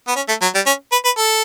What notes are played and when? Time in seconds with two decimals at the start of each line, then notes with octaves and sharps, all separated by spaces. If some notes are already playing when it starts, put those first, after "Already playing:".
0.08 B3
0.16 C#4
0.28 A3
0.42 F#3
0.55 G3
0.66 C#4
0.92 B4
1.05 B4
1.17 A4